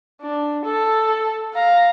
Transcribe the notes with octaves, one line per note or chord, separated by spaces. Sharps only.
D4
A4
F5 A#5